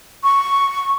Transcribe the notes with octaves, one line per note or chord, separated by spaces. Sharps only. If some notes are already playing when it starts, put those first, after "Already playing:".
C#6